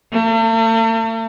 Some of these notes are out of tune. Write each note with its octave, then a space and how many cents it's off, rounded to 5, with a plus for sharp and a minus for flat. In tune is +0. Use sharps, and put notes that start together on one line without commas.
A3 +45